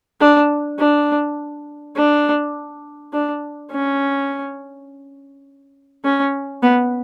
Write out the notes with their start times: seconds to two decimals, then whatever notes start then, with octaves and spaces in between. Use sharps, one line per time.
0.21 D4
0.79 D4
1.96 D4
3.13 D4
3.71 C#4
6.04 C#4
6.63 B3